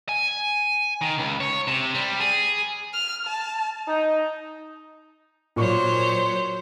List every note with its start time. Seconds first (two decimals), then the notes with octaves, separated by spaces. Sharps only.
0.09 G#5
1.01 D#3
1.18 C#2
1.40 C#5
1.68 C3
1.95 G3
2.20 G#4
2.94 F6
3.27 A5
3.88 D#4
5.56 A#2 F#3 C5 C#5 C#6